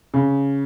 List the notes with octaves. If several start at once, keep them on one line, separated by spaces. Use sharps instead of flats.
C#3